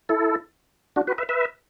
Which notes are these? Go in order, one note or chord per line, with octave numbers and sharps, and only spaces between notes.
E4 A4
D4 F#4
F#4 B4
B4 E5
B4 E5